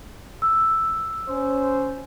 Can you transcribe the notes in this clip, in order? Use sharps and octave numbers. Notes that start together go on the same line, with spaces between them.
E6
C#4 C5